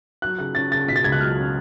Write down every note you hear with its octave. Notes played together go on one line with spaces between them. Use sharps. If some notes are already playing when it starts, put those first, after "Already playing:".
F#3 F#6
C#3 F#6
C#4 A6
C#3 A6
B2 B6
A6
C#2 G#6
F#6
F#3 F6
C#4